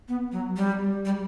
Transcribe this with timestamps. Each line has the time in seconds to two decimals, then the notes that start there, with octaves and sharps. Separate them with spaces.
0.08 B3
0.32 F#3
0.56 G3
1.05 G3